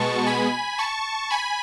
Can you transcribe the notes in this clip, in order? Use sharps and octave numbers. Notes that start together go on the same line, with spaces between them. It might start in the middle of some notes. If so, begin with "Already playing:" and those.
Already playing: B2 G#3 B3 A5 C#6
G#5 B5
A5 C#6
G#5 B5